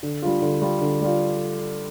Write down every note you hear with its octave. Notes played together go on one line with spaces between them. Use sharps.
D3
G3 D4 F4
D3
G3 D4 F4
D3
G3 D4 F4